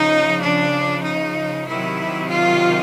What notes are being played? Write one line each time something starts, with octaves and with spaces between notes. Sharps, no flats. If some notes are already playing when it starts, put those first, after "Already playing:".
Already playing: C#3 F3 D#4
D4
D#4
C3 D#3 F#3 E4
F4